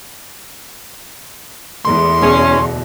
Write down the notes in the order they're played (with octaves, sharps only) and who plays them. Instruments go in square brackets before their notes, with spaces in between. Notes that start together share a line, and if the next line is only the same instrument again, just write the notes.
[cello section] E2 [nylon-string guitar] E3 G#3 A3 [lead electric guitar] C6
[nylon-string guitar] D2 B2 G#4 [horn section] C#4